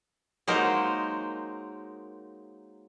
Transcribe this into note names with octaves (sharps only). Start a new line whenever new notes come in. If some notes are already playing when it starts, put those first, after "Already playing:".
F#3 G#3 A#3 D#4 A#4 C5